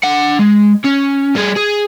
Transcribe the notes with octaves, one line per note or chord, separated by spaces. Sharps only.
D4 F#5
G#3
C#4
G3 G#4
G#4